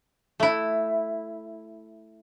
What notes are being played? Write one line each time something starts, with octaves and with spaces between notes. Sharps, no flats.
A3 E4